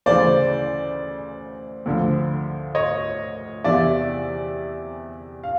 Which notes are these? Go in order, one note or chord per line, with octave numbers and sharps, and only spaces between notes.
D2 C#3 E3 C5 D5
D2 D3 F3
C#5 D#5
E2 C3 E3 D5 E5
F5